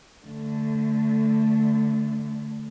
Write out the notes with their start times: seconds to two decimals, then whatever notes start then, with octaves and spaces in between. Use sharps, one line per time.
0.25 D3 A3